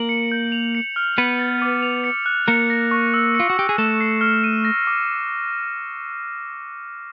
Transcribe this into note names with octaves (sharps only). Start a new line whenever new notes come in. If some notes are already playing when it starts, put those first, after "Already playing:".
Already playing: A#3 A#4 F#7
C#7
G6
F7
C#7
F6
B3 B4 C#7
A6
D6
F7
C#7
F#6
A#3 A#4 C#7
A#6
C#6
E6
F4 C#7
F#4
G4 E6
G#4
A3 A4 E7
C7
F6
D#7
A#6
D6